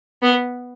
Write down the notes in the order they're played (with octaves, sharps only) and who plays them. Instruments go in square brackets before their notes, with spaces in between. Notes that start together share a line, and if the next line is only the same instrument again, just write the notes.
[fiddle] B3